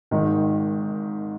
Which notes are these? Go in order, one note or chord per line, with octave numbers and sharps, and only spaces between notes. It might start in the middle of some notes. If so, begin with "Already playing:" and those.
G#1 G#2 D#3